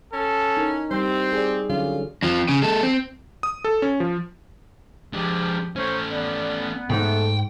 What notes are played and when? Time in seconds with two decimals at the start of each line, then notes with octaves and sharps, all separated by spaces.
0.13 C#4 A4
0.57 D#4 E4 A#4
0.91 G3 C4 D#4 G4 C5
1.33 G#4 D5
1.70 D3 F#3 C#4 F4
2.23 F2 F3
2.49 C#3
2.62 G#3 A4
2.83 C4
3.43 D#6
3.65 A4
3.82 C#4
4.00 F3
5.13 F3 G#3 D4 G4
5.76 A3 C#4 C5 C#5
6.11 B3 D5
6.90 G#2 A3 G5